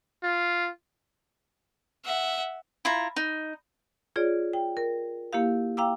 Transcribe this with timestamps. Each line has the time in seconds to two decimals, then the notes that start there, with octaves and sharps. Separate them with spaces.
0.23 F4
2.05 E5 F#5
2.85 E4 F4 A#5
3.16 D#4
4.16 F4 G#4 C#5 D5
4.53 G5
4.77 A#4
5.33 A#3 E4 G4 F5
5.77 F5 G5 A#5 D6 E6